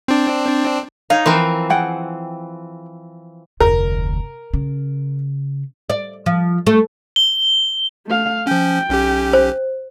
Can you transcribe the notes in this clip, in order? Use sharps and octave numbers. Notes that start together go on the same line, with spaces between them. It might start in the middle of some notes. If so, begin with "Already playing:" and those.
C4 D4
D#4 C#5 F5
E3 F3 C4 A#4 C5
G#4 F#5 G5
F1 D2 A#4
C#3
D5
F3
A3
G7
A3 F5
F3 C#4 G5
B1 C#4 G4
C5